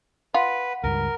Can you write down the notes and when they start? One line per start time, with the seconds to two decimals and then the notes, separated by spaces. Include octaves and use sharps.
0.34 F4 B4 F#5
0.84 C#2 G2 A#4